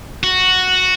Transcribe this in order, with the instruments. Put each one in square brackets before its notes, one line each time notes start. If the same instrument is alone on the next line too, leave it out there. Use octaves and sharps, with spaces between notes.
[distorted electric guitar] F#4